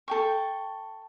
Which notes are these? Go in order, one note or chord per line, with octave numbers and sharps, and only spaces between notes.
A4 G5 C#6